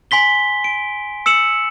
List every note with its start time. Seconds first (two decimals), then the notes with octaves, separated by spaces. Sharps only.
0.11 G#5 C6 B6 G7
0.64 D7
1.26 E6 C#7 E7 F#7